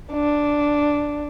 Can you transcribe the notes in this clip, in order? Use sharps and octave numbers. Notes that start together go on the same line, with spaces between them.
D4